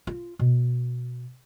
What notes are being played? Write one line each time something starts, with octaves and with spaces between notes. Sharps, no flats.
F4
B2